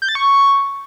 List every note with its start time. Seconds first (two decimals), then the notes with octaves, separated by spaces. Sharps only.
0.02 G6
0.09 A6
0.15 C#6